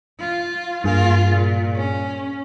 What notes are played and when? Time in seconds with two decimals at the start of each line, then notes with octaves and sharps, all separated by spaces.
0.20 F4
0.84 G2 A#3 F4 G#4
1.31 A#2
1.75 C#4